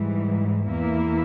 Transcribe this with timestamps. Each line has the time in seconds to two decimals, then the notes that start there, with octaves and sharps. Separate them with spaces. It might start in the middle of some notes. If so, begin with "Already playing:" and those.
Already playing: G#2 E3 G3
0.67 E2 E3 A#3 E4